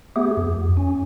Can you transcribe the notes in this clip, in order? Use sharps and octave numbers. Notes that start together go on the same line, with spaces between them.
A3 B3 G4 G#4
F2
C#4